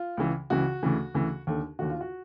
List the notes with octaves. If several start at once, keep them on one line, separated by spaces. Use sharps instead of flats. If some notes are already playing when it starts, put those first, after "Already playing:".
Already playing: F4
C#2 C#3 E3
C#2 C#3 E3 F#4
D2 C#3 E3
D2 C#3 E3
D#2 D3
D#2 D3 F#4
F4
F#4